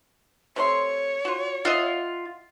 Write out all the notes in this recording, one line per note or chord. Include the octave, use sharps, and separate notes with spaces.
C3 A3 C#5 C6
F4 F#4
F4 D#5 E5 F#5